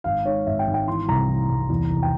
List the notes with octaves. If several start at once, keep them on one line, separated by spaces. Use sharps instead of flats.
G#1 F5
G#2 C#5
G#1 E5
G5
G#1
G5
E3 C6
C2 A#5
E3
C2
E2
F1
G5